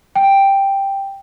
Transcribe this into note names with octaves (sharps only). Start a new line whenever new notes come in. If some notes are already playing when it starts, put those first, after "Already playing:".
G5